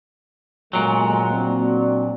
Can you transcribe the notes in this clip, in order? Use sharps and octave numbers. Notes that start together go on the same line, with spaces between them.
G1 A#2 F#3 G#3
A#3 C4 D4 F#4